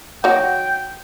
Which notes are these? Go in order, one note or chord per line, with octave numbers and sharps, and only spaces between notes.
F#3 D#4 F#4 G5